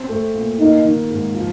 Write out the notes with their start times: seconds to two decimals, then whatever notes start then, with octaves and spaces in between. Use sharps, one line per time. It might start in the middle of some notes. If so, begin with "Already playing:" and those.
Already playing: C4
0.09 A3
0.34 A#2
0.59 A#3 D#4
0.85 D#3
1.10 G#2
1.35 F3